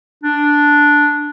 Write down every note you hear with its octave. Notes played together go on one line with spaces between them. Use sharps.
D4